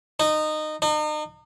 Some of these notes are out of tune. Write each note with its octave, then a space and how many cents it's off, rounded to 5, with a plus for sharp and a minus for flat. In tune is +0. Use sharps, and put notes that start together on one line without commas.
D#4 -20
D#4 -40